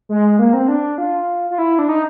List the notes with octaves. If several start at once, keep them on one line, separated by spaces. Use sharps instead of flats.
G#3
A#3
C4
D4
F4
F4
E4
D4
D#4